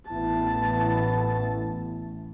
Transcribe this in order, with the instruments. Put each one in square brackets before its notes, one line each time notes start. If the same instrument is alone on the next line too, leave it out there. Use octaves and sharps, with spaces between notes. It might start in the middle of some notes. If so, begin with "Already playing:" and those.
[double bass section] A1 A2 [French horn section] B3 E4 [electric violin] A5